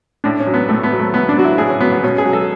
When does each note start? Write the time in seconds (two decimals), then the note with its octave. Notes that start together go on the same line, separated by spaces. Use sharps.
0.24 A2 D4
0.40 C#4
0.46 F#3
0.54 B3
0.69 A2 A3
0.83 B3
0.92 F#3
0.99 A3
1.14 A2 B3
1.29 D4
1.37 F#3 F#4
1.44 E4
1.58 A2 G#4
1.70 C#4
1.80 F#3 B3
1.92 B3
2.03 B2 C#4
2.18 G#4
2.25 F#3
2.33 A4